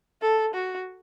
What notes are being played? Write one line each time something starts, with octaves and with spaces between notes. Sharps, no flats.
A4
F#4